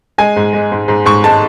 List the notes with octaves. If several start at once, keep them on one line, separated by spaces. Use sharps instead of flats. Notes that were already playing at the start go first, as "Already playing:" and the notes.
G#3 G#5
G#2
G#3
G#2
G#2
G#2 C#6
G#3 A5